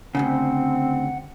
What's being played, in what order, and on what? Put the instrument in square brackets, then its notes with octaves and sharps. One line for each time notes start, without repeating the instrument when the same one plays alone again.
[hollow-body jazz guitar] D2 G2 C#3 [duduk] C4 [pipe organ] F#5